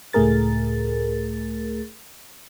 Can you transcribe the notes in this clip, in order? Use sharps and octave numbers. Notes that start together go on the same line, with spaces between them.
C#2 A2 A3 G#4 A#4 A6